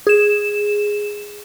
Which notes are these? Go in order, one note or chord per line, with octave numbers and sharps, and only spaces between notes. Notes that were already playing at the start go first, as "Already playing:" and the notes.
G#4 E7